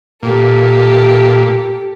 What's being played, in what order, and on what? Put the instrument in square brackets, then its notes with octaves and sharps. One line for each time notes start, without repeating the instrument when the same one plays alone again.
[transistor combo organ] A#2 [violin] G4 A4